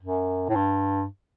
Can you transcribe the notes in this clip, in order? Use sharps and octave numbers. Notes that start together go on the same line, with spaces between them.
F#2
A2
G2